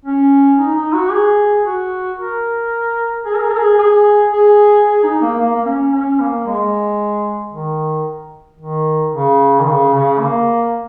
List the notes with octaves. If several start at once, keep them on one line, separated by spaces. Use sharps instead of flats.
C#4
D#4
D#4
F#4
G#4
F#4
A#4
G#4
A#4
G#4
A#4
G#4
G#4
G#4
G#4
D#4
A#3
A#3
A#3
C#4
C#4
A#3
G#3
D#3
D#3
C#3
D#3
C#3
C#3
A#3